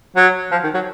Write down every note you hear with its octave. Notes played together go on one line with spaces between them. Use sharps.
F#3
F3
D#3
F#3